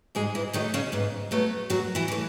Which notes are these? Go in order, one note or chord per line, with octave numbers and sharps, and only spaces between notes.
G#2 G#3 G#4
E3 E4
D#3 F#3 A3 D#4
C#3 C#4
G#2 B3
F#3 A3 B3
F#2 F#3 F#4
E3 E4
E3 A3